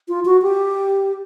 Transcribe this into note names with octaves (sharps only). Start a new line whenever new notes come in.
F4
F#4
G4